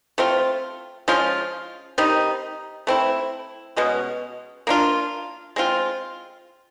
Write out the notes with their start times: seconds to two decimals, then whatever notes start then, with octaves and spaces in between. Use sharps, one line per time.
0.18 A3 C4 F4
1.08 F3 G#3 C#4 F4
1.98 D#3 G3 C4 D#4
2.87 A3 C4 E4
3.76 B2 G#3 C#4
4.67 A#3 D4 F4
5.56 G#3 C4 F4